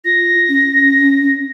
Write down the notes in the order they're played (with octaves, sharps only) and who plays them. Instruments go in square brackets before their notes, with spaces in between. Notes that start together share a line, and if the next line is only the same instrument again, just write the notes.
[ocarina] F4 [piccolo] A#6
[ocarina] C#4